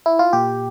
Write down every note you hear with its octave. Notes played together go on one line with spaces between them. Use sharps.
E4
F4
A#2 G4